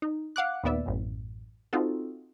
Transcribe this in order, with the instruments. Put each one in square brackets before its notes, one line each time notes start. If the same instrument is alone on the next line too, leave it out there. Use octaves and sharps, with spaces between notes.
[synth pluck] D#4
F5 F#5 D6 F#6
D#2 A#2 B3 D5 E5
A1 F#2
C4 D#4 F4 F#4 A4